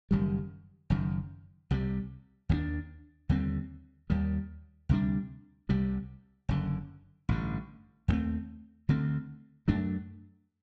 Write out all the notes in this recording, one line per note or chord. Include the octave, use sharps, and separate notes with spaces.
F#1 F#2 D#3 G3
F#1 F#2 D#3
C2 C3 G3
D#2 D#3 G3 D4
D#2 D3 G3 C4
D#2 D#3 G3
D2 C3 G3 D4
C2 C3 G3
F#1 F#2 D3
A1 G2 D3
D#2 D3 A3 C4
D2 D3 A3 C4
F#2 F#3 A3 D4